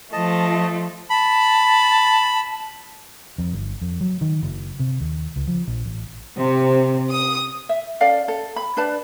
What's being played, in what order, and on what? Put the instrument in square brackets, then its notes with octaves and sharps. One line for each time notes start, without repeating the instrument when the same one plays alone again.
[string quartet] F3 A3 [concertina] D#5 A5
[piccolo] A5 [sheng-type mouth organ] B5
[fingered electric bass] F2
G1
F2
F#3
D#3
F#1
C3
D#2
C#2
F3
A#1
A1
[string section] C3
D#6
[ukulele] E5
C#4 A4 D5 F5
A4
B5
D4 B4 D5 A5